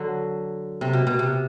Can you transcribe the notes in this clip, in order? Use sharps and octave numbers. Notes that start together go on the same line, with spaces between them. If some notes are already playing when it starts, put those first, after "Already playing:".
Already playing: D3 F#3
C3
B2
B2
C3